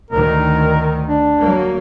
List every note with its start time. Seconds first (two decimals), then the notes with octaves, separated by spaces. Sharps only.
0.11 D2 D#3 A#4
1.07 D4
1.40 F#3 A#3